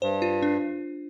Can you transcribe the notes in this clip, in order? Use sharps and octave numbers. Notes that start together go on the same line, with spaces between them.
G2 C5
F4
D4